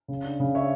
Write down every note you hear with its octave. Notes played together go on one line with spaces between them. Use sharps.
C#3
D4
C#3
D4 C#5 E5